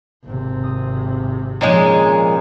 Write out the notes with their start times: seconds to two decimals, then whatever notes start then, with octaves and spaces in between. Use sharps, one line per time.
0.24 G#1 C3
0.64 D#6
1.61 A#2 D#3 F3 G#3 C#4